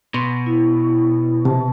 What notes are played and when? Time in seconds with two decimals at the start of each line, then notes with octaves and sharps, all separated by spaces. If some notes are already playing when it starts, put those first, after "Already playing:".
0.14 B2 C6
0.46 E4
1.45 C3 A5